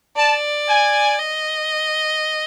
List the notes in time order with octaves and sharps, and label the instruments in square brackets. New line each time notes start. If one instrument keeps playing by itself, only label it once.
[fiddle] D5 [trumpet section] A5
[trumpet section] G#5
[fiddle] D#5